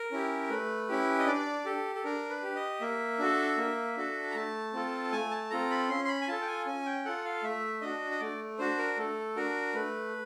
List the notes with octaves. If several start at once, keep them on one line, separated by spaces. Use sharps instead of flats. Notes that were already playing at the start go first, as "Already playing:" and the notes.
Already playing: A#4
C#4 E4 G4
A3 B4
C#4 E4 G4
D#5
D4 D5
G4 A4
A4
D4 A#4
B4
G4
D#5
A#3 E5
D4 F#4 A4
A#3
D4 F#4 A4
A#5
A3 A5
C4 F4 A4
A3 G#5
A5
C4 F4 A4 A#5
B5
C#4 C6
C6
B5
G#5
F4 A4 A5
G5
G#5
C#4 G#5
G5
F4 A4 F#5
F5
A3 E5
D4 F#4 D#5
D#5
A3 D5
D4 F#4 C5
A#4
A3 A4
D4 F#4 A#4
A3 B4